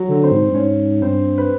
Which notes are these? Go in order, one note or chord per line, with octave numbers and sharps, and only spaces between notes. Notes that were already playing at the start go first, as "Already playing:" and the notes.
Already playing: F#3 F#4
D3
C4 C5
G#2
G2
G#2 C#4 C#5
G2 C4 C5
B4